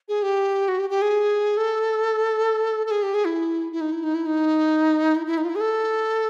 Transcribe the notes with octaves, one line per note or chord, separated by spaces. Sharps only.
G#4
G4
F#4
G4
G4
G#4
A4
A4
G#4
G4
G#4
E4
E4
D#4
E4
D#4
E4
D#4
E4
E4
D#4
F4
E4
G#4
A4